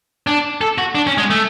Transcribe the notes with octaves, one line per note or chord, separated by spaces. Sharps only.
D4
A4
F#4
D4
C#4
G#3
A3